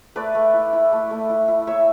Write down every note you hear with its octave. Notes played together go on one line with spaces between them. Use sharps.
A3 B4 D5
A3
E4
E4
A3
A3
E4
E4
E4 C#5 E5